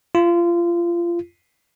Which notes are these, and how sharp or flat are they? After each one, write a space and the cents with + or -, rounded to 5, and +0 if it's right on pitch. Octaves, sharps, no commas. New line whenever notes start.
F4 -25